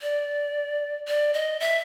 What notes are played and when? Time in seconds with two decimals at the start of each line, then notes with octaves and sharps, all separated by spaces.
0.02 D5
1.08 D5
1.34 D#5
1.60 E5